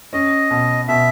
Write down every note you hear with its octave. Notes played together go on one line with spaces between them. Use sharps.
C#4 D#5
B2
B2 E5